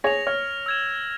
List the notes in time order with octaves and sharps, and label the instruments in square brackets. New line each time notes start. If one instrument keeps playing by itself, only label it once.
[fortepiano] G#4 C#5 [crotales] A#6 F7
[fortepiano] C#5 [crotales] F6
[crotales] E6 G#6 E7